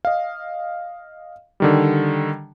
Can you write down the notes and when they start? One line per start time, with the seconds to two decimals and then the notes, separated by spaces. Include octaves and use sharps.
0.05 D#5 F5
1.60 D3 D#3 G3